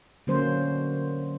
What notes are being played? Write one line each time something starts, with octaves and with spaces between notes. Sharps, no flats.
D3 F#3 A#3 C#4 C5